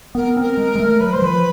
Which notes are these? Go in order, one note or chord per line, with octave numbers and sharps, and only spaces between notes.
B3 A#4
C4
A#4
G#3
G#3
A3
F#3 B4
F#3 C5
F3 B4